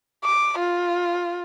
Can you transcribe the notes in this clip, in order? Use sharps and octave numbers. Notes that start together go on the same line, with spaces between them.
D6
F4